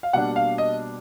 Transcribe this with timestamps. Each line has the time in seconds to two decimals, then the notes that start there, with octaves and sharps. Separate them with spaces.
0.03 F5
0.13 B2 G3 A#3 D4 F#5
0.36 F5
0.58 D#5